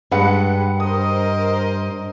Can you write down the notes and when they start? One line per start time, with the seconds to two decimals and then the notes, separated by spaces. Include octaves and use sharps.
0.12 G2 G#3 B4 F#5
0.80 A#4 C5 D#5 D#6